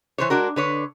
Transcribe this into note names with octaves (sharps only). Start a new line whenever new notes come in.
E3 C5 C#5
G#3 D4 F#4 A#4
D3 B4 C#5